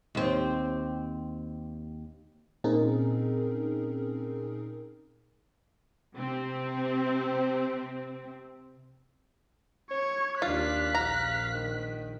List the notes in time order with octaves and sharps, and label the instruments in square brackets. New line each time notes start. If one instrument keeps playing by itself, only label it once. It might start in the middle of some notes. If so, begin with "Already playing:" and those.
[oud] D#2 C4
[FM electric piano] A#2 C4 C#4 D#4 G#4 A#4
[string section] C3 C4
[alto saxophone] C#5 [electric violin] C#6 G#6
[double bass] D#2 D4 [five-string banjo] F4 [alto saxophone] F5 [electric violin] F#6 B6
[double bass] A#1 [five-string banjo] A#5
[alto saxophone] D#3